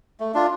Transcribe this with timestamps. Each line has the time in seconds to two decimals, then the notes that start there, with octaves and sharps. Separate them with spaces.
0.20 A3
0.34 D4 F4